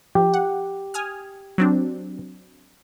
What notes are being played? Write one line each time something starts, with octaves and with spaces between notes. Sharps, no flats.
F3 G4
F#5
G#5 D#6 F6
F#3 C4 D4